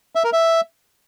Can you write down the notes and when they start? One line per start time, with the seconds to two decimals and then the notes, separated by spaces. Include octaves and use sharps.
0.15 E5
0.24 A#4
0.33 E5